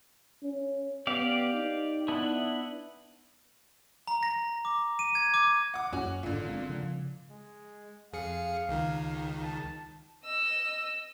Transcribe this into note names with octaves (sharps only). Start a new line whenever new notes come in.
C#4
B3 G4 D5 F5
D#4
B3 D4 E4
A#5
A#6
D6
D#7
G#6
D6
F#5 D6
F#2 A#3 C#4 F#4
G#1 A#2 D3
G#3 C4 D4
C#3 F3
G#3
F2 G#4 F5 C#7
C#2 D#3
A5
D#5 E6